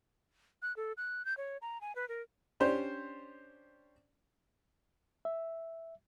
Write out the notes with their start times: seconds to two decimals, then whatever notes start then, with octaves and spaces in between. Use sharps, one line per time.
0.62 F#6
0.76 A4
0.97 F#6
1.25 G6
1.37 C#5
1.62 A#5
1.81 G#5
1.96 B4
2.09 A#4
2.60 C#4 D4 G4 C5
5.25 E5